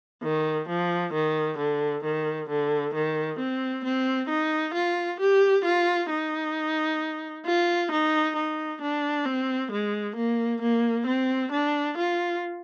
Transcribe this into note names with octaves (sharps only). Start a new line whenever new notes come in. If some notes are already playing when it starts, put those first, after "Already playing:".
D#3
F3
D#3
D3
D#3
D3
D#3
C4
C4
D#4
F4
G4
F4
D#4
F4
D#4
D#4
D4
C4
G#3
A#3
A#3
C4
D4
F4